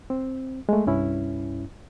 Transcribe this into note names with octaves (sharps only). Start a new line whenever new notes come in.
C4
G#3 A3
C2 G2 C#4 E4